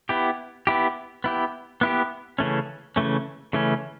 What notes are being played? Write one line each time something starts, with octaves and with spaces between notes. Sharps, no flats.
B3 E4 G4
B3 E4 G4
B3 E4 G4
B3 E4 G4
C#3 E3 A3 C#4
C#3 E3 A3 C#4
C#3 E3 A3 C#4